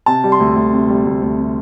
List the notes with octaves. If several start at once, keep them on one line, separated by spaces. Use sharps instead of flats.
C3 A5
G3
C6
D2
D2
C3
G3
D2
D2
C3